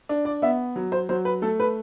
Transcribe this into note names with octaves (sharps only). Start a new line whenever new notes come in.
D4
D5
B3 E5
F#3
C5
F#3 C5
B4
A3 A4
B4